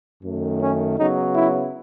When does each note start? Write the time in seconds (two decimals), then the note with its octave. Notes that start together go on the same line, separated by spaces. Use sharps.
0.23 F#2 D#3 A3
0.60 C#4
0.97 C#3 F#3 B3 D#4
1.35 E4